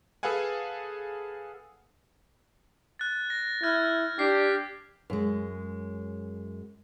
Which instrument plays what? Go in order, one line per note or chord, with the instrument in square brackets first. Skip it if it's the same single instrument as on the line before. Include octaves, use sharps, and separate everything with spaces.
[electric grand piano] G#4 A4 B4 F5 F#5 G#5
[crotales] F#6 A6
A#6
[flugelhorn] E4 [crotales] F6 F#6 G#6
[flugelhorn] D4 [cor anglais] G4 [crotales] C7
[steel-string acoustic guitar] F#2 G#3